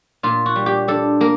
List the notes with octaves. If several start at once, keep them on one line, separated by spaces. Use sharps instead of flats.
A#2 F4
F#4
G3
G4
D4 A4
A#3 A#4